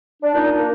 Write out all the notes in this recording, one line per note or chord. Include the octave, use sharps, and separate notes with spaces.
D4
A#2 D#4
D4
A#3